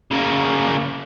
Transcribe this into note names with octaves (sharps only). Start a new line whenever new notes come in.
C#3 A#3